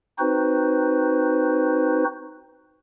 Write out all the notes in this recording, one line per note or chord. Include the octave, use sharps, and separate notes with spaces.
C4 D#4 F#4 B4 C5